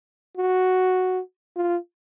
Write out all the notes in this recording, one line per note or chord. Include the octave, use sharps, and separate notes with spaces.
F#4
F4